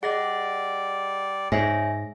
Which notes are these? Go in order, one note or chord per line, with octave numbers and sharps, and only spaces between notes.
G3 G#4 D5 D#5 F#5 A#6
G#2 C#5 E5 G#5 A#6